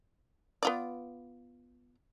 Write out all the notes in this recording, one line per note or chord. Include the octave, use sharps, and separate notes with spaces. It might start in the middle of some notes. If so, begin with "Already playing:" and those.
B3 F4 D5